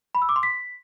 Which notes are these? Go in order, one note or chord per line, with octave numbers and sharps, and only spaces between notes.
B5
E6
D6
C6
B6